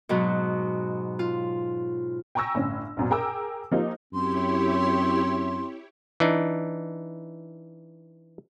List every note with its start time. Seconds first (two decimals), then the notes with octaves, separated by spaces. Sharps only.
0.09 G#2 B2 F#3
1.19 F4
2.35 G5 G#5 A#5 C#6 E6 A#6
2.55 G1 A2 C#4
2.97 A#1 F#2 B2
3.10 G#4 A#4 G5 A#5 D6 E6
3.71 F3 A#3 D#4 F4 G4
4.13 F#2 C4 E4 G4 C#5 C6
6.20 E3 D4 D#4